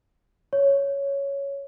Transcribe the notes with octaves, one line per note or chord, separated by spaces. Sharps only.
C#5